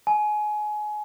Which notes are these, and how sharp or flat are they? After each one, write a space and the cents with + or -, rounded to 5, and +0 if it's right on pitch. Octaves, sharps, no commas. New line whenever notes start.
G#5 +25